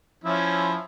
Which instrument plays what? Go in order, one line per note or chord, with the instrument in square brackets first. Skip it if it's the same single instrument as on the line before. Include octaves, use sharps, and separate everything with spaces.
[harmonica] F3 C#4 E4